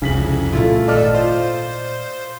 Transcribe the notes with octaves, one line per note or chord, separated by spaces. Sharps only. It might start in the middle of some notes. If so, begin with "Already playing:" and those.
C2 F2 C#3 G#3 B6 F#7
A#2 A3 E4 F4
G#1 A2 A4 D5 D#5 F6
F4 C5